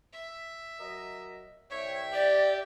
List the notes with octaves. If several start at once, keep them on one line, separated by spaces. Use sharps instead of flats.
E5
F#3 A#4 D#5
C2 C#5 E5 G5
G4 D5